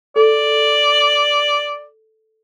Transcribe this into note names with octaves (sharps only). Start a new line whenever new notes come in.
A4 D5